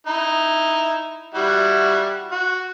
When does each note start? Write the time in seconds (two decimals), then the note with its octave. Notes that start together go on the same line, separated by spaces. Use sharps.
0.07 D#4 E4
1.35 G3 E4 F#4
2.32 F#4